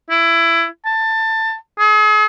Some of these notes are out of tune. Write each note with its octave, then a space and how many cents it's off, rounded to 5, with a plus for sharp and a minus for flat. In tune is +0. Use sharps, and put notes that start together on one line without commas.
E4 +20
A5 +20
G#4 +40